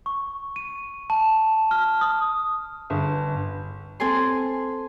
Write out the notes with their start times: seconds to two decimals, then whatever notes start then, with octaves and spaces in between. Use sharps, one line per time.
0.06 C#6
0.56 D#7
1.10 A5
1.71 F6
2.01 D#6
2.90 G1
4.00 C4 A4 G#5 C6